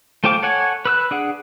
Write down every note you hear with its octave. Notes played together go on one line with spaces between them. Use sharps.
A3 F4 C5 G5 D6
A4 C#5 F#5 G#5
B4 E6 F#6
D4 G#4 F#5